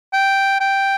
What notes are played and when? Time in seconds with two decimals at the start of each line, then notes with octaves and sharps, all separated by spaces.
0.13 G5
0.61 G5